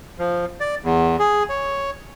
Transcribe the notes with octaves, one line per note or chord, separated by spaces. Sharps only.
F3
D5
E2
G#4
C#5